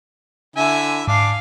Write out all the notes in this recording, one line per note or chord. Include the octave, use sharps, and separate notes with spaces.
D3 E4 E5 G#5
G#2 D4 F5 D6